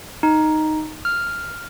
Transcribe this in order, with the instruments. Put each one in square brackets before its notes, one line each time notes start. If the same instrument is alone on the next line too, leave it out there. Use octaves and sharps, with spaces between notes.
[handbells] D#4
F6